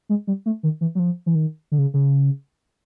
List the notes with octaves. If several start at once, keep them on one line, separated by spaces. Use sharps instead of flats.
G#3
G3
A3
D#3
E3
F#3
F3
E3
D#3
D3
C#3
C#3